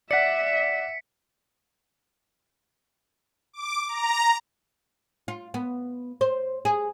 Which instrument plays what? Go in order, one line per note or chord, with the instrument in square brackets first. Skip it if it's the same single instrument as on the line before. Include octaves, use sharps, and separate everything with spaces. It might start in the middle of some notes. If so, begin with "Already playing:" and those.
[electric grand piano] D5 F#5 [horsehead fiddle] E5 [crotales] B6 C#7
[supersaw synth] D6
A#5
[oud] F4
B3
C5
G#4